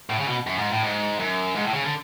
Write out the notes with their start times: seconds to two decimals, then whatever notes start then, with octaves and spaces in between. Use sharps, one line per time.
0.10 A2
0.18 C#3
0.28 B2
0.47 F#2
0.58 G#2
0.71 A2
0.83 G#2
1.19 F#2
1.56 G#2
1.65 A2
1.74 C#3
1.85 D3